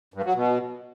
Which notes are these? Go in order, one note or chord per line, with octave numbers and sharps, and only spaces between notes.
G2
F#3
B2